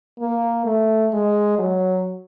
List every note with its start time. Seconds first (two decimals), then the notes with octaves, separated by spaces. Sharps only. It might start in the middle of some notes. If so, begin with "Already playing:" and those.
0.20 A#3
0.65 A3
1.13 G#3
1.58 F#3